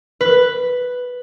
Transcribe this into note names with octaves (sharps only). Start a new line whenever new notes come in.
B4